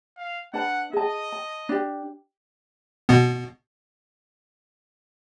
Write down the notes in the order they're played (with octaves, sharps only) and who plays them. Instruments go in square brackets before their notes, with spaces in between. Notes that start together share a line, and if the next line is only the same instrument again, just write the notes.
[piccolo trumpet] F5
[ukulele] D4 B4 A5 [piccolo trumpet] F#5
[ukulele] G#4 A5 [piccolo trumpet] D#5
[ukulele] A5
D4 G4
[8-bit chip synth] B2 B3